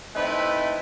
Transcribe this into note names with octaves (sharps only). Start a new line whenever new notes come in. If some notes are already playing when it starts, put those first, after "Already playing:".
A3 C4 D#4 E4 B4